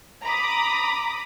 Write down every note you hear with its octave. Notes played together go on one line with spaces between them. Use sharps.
A#5 B5 D6 D#6